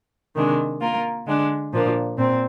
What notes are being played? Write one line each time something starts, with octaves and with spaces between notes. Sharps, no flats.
C3 D#3 G#3 D4
A#3 F4 A#4
D3 G#3 D4
A#2 F3 A#3 D4
A#2 C4